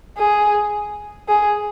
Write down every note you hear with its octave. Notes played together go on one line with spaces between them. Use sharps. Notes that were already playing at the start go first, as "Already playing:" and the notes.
G#4
G#4